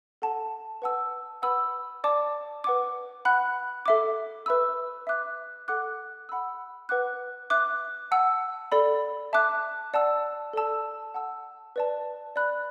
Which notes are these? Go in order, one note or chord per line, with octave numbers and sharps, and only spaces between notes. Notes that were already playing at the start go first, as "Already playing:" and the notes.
A4 F#5 A5
B4 F#5 A5 E6
B4 F#5 B5 E6
D5 A5 D6
B4 F#5 D6
F#5 B5 F#6
A4 E5 D6
B4 E5 B5 E6
E5 D6 F#6
A4 F#5 D6 F#6
F#5 B5 E6
B4 F#5 D6 F#6
E5 D6 F#6
F#5 A5 E6
A4 D5 B5
E5 A5 D6 F#6
D5 F#5 A5 E6
A4 D5 A5 E6
F#5 A5 E6
B4 D5 A5
D5 B5 F#6